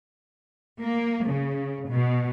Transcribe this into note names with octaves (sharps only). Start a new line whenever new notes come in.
A#3
C#3
B2